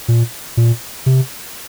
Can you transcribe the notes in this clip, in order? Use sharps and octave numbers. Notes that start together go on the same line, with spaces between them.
A#2
A#2
C3